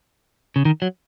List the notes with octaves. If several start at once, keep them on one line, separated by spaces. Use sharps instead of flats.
C#3
D#3
F#3